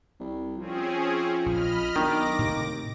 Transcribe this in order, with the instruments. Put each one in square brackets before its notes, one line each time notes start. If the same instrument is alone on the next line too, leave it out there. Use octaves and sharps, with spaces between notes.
[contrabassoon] C2
[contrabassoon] F3 [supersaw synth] C4 C#4 G#4
[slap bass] A#1 [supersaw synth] D#5 B5 F6
[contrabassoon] B1 [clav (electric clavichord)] D#3 [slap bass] D4 [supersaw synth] D6 A#6
[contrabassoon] D#2 [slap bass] A2 C3